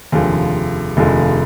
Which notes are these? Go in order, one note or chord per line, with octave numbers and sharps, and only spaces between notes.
F1 D#2 D3 F3 G#3
F1 D#2 D3 F3 G#3